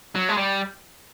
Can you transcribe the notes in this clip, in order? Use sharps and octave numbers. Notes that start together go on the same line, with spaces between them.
F#3
G#3
G3